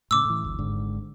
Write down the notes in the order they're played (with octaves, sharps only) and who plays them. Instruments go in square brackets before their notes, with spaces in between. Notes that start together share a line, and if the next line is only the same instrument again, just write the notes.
[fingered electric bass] A2 C#3 [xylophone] D6 E6
[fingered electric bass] A2 E3
G1 D2
G#1 G#2 D3